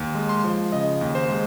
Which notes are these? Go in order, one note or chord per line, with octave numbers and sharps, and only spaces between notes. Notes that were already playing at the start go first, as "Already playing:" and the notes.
Already playing: D#2
G#3
C6
F3
C#3 D#5
D#2
C5
G#3